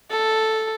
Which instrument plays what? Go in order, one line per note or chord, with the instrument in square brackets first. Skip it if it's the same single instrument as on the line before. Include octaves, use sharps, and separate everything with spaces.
[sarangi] A4